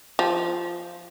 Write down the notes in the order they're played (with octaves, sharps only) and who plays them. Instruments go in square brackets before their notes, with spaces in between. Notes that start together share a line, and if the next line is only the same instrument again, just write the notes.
[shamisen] F3